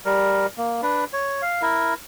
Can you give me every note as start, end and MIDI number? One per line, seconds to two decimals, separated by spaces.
0.05 0.47 55
0.05 0.47 70
0.58 0.81 58
0.82 1.04 62
0.82 1.04 71
1.13 1.42 73
1.42 1.62 77
1.62 1.94 64
1.62 1.94 70